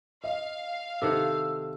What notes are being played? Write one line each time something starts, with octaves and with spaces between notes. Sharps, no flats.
D#5 F5
C3 D#3 A4 F#5 E6